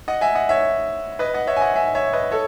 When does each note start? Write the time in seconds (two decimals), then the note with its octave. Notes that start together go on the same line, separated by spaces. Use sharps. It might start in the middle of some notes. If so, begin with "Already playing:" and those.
0.08 D#5 F#5
0.21 E5 G#5
0.35 D#5 F#5
0.49 C#5 E5
1.19 B4 D#5
1.34 D#5 F#5
1.47 C#5 E5
1.57 G#5
1.61 D#5 F#5
1.76 E5 G#5
1.95 C#5 E5
2.13 B4 D#5
2.32 A4 C#5